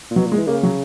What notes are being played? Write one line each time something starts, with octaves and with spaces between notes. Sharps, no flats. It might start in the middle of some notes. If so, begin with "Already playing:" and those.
A#2
B2 F#3
A#2
G#3
E3
C#3 A#3
F#3